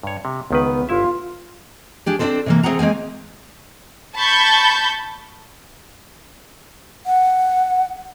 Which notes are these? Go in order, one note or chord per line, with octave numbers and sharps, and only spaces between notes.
G2 C#5
C3
C#2 D#3 B3 B4
G1 E4 F4 E5
D4 G4 G#4
C4 D4 D#4 F#4 A4 C5
C3 E3 A#3
A3 C4 G#4 F#5 A#5
G#3 A#3 C4 G#5
A5 B5 C#6 G6
F#5